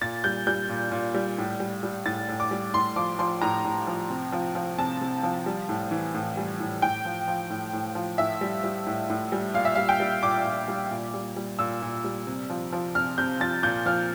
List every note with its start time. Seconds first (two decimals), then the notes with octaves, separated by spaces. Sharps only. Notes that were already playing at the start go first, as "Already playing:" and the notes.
0.01 A#2 A6
0.24 G3 G6
0.47 G3 G6
0.69 A#2
0.92 A#2
1.14 G3
1.38 A2
1.60 G3
1.83 G3
2.06 A2 A6
2.28 A2
2.40 D6
2.51 G3
2.74 A2 C6
2.96 F3 D6
3.19 F3 C6
3.42 A2 A#5
3.64 A2
3.87 F3
4.10 C3
4.32 F3
4.55 F3
4.78 C3 A5
5.01 C3
5.23 F3
5.46 G3
5.69 A2
5.91 E3
6.14 A2
6.37 G3
6.60 A2
6.82 A2 G5
7.05 F3
7.28 F3
7.50 A2
7.73 A2
7.95 F3
8.18 A2 E5
8.41 G3
8.64 G3
8.86 A2
9.10 A2
9.32 G3
9.54 A#2 F5
9.65 E5
9.75 G3 F5
9.89 G5
10.00 G3
10.23 A#2 D6
10.46 A#2
10.68 G3
10.91 A#2
11.14 G3
11.36 G3
11.59 A#2 E6
11.82 A#2
12.04 G3
12.27 C3
12.50 F3
12.72 F3
12.95 C3 F6
13.18 C3 G6
13.40 F3 A6
13.63 A#2 G6
13.86 F3 F6